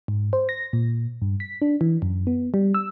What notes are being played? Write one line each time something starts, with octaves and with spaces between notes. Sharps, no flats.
G#2
C5
A#6
A#2
G2
B6
D4
E3
F#2
B3
G3
E6